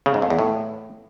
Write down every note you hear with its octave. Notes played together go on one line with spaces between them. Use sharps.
C#3
G#2
F2
E2
A2